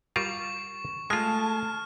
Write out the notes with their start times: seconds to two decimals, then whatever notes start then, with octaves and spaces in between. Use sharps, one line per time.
0.16 G3 F4 A#4 C#6
1.10 G#3 A3 F4 A5 F6